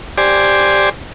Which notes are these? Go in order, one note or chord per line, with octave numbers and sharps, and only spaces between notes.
G4 C5 D5 G#5